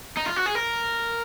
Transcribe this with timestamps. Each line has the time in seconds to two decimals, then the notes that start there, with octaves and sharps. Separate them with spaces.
0.17 D#4
0.26 F4
0.36 F#4
0.46 G#4
0.55 A#4